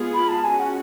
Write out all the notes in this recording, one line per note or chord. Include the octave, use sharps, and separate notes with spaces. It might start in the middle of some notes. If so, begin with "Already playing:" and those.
Already playing: G#3 B3 F4 G#4
B5
A5
G#3 C#4 F#4 G#5
F#5